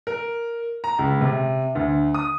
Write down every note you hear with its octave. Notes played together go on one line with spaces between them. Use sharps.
A#4
A#5
C#2
C3
D2
D#6